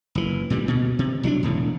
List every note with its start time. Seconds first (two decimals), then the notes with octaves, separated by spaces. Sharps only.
0.15 F#1 E3
0.50 A#2 D3 G3
0.66 D2 B2
0.99 C3
1.23 C2 F#3 C4 D4
1.43 E1 A2 D3